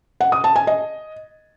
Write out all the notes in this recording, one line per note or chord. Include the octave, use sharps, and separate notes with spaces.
F#5
D#6
A5
G#5
D#5